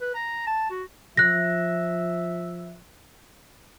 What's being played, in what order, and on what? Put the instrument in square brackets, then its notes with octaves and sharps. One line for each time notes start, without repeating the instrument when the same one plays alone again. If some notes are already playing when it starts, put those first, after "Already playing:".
[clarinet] B4
A#5
A5
F#4
[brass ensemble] F3 E5 [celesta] F#6 A#6